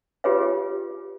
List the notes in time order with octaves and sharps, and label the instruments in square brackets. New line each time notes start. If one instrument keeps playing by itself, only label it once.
[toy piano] F4 G4 G#4 B4 C#5 F5